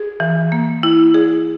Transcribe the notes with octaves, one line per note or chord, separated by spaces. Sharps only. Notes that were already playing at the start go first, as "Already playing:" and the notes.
Already playing: G#4
E3
A#3
E4
G#4